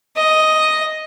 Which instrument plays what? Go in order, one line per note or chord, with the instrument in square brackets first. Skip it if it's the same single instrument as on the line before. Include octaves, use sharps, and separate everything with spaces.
[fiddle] D#5